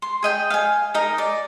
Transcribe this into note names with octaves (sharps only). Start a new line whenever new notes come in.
C6
G#4 D#5 G5
F5 G#5
D#4 A#4 D#5
D5